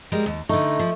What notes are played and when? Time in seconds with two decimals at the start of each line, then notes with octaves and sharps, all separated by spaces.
0.12 G3 G#3 A#4
0.26 D#2
0.49 D3 A3 D#4
0.79 F3